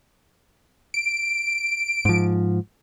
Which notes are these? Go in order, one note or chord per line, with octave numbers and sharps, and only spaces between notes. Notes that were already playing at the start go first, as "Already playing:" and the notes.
D7
G#2 F3